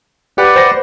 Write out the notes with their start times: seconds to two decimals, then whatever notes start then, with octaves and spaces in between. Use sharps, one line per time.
0.38 G4 B4 D5 F#5
0.56 C5 A#6